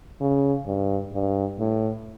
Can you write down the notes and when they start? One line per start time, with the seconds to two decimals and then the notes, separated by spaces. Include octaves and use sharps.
0.21 C#3
0.67 G2
1.13 G2
1.59 A2